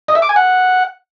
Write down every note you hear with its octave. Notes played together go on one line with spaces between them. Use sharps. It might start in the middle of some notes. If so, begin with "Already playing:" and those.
D#5
E5
D6
G#5
F#5